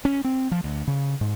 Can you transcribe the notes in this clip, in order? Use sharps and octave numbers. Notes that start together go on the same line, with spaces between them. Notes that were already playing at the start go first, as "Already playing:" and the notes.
C#4
C4
F3
D2
C#3
G#2